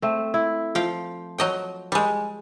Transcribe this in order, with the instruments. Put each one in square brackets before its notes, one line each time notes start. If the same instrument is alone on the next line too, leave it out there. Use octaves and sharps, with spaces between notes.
[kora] A3 C4
E4
[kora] F3 [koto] F5 G5
[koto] F#3 D#5 G5
G3 G#3